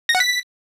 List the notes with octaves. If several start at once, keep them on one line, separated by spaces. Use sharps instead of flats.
A#6
F#5
B6